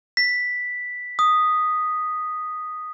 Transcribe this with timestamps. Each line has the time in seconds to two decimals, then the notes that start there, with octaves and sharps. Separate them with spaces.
0.17 B6
1.19 D#6